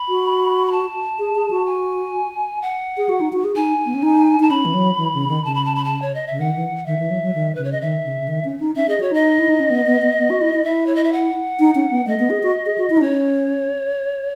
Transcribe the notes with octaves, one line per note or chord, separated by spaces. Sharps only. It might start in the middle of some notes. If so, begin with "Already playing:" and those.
Already playing: B5
F#4
B5
A5
G#4
G#4
F#4
G#5
F#5
G#4
F#4
D#4
F#4
G#4
D#4 G#5
B3
C#4
D#4
D#4 A5
C#4 B5
E3
F#3
E3
C#3
D#3
C#3 A5
B5
A5
B5
A5
C#5
D#5
C#3 E5
D#3 F#5
E3
D#3 E5
E3
F#3
F#3
D#3
C#3 B4
C#5
D#5
D#3 E5
C#3
C#3
D#3
C#4
D#4
C#4 E5
G#4 D#5
F#4 C#5
D#4 D#5
E4
D#4
C#4
B3
B3
B3
B3
F#4
E4
E4
E4 E5
C#5
D#5
E5
F#5
D#4
C#4
B3
A3 D#5
B3
G#4
F#4
G#4
F#4
E4
D#4
C#4 C#5